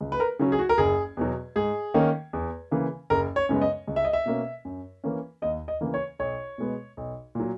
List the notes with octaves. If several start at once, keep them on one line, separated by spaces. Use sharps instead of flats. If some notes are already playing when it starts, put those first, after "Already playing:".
C#2
B4
A#4
C#3 F#3 C#4
G#4
F#4
A#4
F#1 G#4
E2 B2 F#3
G#2 G#4
D#3 A#3 C#4
E2
C#3 E3 A#3
F#1 A#4
C#5
F#2 C#3 G#3 B3
D#5
C#2
E5
D#5
E5
B2 A#3 C#4
F#2
E3 A#3 C#4
D#2 D#5
D#5
C#3 E3 A#3
C#5
B1 C#5
B2 G#3 B3
B1
A#2 F#3